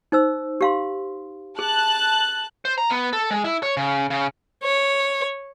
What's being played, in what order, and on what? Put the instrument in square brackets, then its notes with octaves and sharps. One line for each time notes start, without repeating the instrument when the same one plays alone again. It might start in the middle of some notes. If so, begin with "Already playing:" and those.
[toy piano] D#4 C5 E6
G4 F5 C6
[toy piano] G#4 [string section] A5 F#6
[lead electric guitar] C5
A#5
B3
A4
G#3
E4
C#5
C#3
C#3
[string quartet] C#5